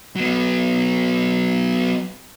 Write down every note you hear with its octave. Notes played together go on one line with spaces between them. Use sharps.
F#3 B3